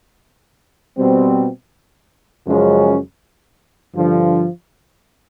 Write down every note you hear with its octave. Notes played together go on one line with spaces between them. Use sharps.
B2 G3 C4
F#2 C#3 F3 G#3 C#4
G2 D3 F3